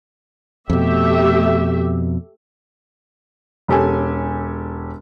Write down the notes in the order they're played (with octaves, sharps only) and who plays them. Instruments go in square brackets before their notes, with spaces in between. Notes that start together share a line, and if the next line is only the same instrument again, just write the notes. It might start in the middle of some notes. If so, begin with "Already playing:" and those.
[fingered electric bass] F2 B2 [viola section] A3 G4 E5
[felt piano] E1 C#4 G4 A4 G#5